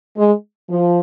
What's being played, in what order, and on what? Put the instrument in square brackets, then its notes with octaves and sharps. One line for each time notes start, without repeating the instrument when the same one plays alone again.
[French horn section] G#3
F3